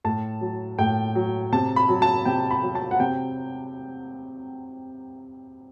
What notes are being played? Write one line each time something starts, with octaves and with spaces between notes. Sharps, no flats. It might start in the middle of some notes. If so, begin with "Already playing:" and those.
A2 A5
F#3
A2 G5
F#3
C3 A5
B5
F#3
A5
C3 G5
B5
F#3
A5
F#5
C3 G5